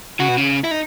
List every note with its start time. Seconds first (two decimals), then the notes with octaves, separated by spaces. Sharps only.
0.20 C#3 F#4
0.29 B2
0.38 C#3
0.64 E4
0.71 D#4